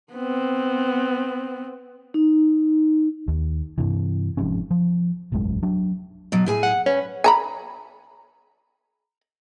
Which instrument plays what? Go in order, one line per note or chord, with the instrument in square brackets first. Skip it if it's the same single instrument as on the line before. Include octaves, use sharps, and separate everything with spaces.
[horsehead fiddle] B3 C4
[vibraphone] D#4
[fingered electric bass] D#2
G2 C3 E3
F1 F2 G#2 C#4
F3
E1 A1 F#2 G#3
F#3 D4
[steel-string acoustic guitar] B2 F#3
A2 G#4 G#5
[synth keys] F#5
[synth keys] C#4 [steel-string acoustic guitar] B4
[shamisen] G#5 A#5 B5